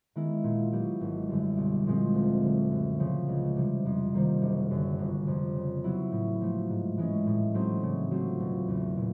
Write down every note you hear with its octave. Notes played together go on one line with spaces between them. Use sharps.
D#3 G#3 B3 E4
A#2
F#3 B3 E4 G4
G#1
F#2 D3 G3
B1
A#2 F3 G#3 C4
D2
D3 F#3
F#2
C#3 F3
C#2
C3 E3 G3
F2
C3 D#3 G3 A#3
F#1
F#2 D3
G1
F2 C3
C#3
F#3 B3 E4
A2
F3 A3
G#2
E3 G#3 C#4
A2
F#3 A3 C4 D#4
C#3
F#3 A3 C4 F4
E1
E2 C#3
A#2